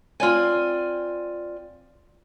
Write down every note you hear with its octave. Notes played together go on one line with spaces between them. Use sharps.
C4 F4 D5 G#5